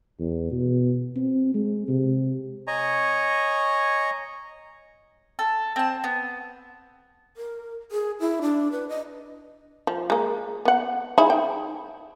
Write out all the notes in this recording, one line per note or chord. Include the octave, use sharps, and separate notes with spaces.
E2
B2
C4
G#3
C3
C#5 D#5 G#5 A#5 C#6
A4
C4 A5
B3
A#4
G#4
E4
D4
B4
D#5
F3
G#3 A#3
B3 F#5
D#4 E4 G#4
G5